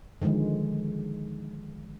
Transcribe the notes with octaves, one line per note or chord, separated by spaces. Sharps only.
D3 D#3 F3 G#3